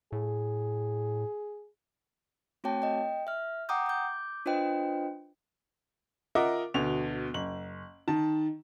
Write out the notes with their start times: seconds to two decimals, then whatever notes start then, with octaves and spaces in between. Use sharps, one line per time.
0.12 A2 G#4
2.64 A3 C4 F#4 C#5 G5 A5
2.82 D#5 G5
3.27 E5 F6
3.69 F#5 G5 A#5 D6 D#6 G6
3.86 D6 G6
4.46 D4 F4 B4 C5 D#5 G5
6.35 F4 A#4 D#5 E5 F#5 D6
6.74 D2 B2 F7
7.34 F#1 F#7
8.08 D#3 A5